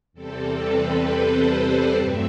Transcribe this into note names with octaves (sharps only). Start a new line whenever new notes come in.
E2 C3 G3 C4 A4
B4
C5
G2 F#3 A3 C4 E5